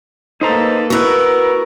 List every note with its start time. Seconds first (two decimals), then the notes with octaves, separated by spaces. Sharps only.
0.41 A#3 D#4 A4 B4 C5 A#5
0.90 B3 E4 F#4 A#4 B4